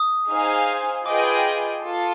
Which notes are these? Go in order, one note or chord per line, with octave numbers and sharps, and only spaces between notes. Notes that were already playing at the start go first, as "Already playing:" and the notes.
Already playing: D#6
D#4 G#4 C5 F5 G#5
F4 G#4 B4 D#5 G5 D6
F4 A4